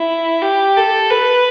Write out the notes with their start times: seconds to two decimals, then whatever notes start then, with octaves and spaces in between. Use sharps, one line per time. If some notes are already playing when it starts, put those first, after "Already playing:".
Already playing: E4
0.42 G4
0.76 A4
1.10 B4